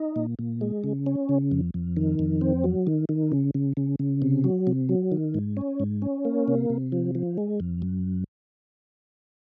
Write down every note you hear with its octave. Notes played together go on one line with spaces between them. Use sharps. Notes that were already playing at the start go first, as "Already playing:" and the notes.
Already playing: D#4
A#2
A#2
G#3
C#3
C#4
C#3
F2
F2
D#3
F2
C4
F#3
D#3
D#3
C#3
C#3
C#3
C#3
C3
F#3
C3
F#3
D#3
G#2
C#4
G#2
C#4
A#3
C3
C3
F3
F3
G#3
F2
F#2